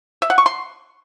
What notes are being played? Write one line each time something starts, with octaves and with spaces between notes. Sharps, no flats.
E5
F#5
C#6
C6